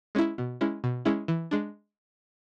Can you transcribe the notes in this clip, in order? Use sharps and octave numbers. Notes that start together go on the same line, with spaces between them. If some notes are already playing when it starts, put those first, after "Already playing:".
G#3 C#4 E4
B2
G#3 C#4 E4
B2
G#3 C#4 E4
E3
G#3 D4